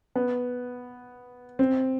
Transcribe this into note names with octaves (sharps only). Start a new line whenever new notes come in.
B3
C4